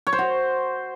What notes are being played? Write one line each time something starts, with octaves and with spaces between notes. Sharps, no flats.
C#5
C5
F#4